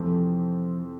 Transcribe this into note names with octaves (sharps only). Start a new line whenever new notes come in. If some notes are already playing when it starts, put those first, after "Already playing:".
Already playing: F2 C3 E3 F3 A3 C4